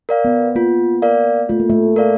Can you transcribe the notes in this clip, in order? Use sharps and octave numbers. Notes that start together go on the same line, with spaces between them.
A#4 D5 F5
B3
A#3 F4
A#4 D5 F5
A3 F4
A#3
A3
A#4 D5 F5